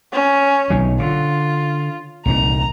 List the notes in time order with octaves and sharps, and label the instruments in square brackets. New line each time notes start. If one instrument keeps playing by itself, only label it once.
[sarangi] C#4
[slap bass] B1 D#3 F#3
[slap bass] D3 [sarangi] F4
[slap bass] C2 A#2 D#3 [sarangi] A#5